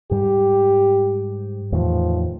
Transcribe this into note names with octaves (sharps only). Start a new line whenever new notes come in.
G#2 G3 G4
E2 A2 D#3 F3